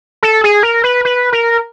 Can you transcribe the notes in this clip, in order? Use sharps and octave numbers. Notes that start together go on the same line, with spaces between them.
A4
G#4
A#4
B4
B4
A#4